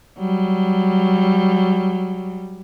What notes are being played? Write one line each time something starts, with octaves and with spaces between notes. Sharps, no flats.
F#3 G3